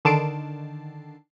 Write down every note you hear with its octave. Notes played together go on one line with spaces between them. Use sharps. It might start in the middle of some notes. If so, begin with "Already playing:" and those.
D3 D#3 A5 C7 D7